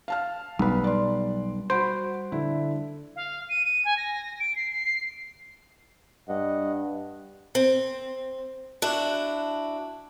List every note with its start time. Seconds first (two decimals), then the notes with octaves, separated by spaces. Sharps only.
0.08 F5 A5 F6
0.59 B1 G3 B4
0.84 D5 C6
1.70 F#4 C5 B5 D7
2.32 D3 E4
3.16 F5
3.49 D#7
3.65 D#7
3.85 G#5
3.97 A#6
4.40 D7
4.56 C7
4.72 C7
6.29 G2 D#5 F#5
7.55 C4
8.82 D4 E4 F#4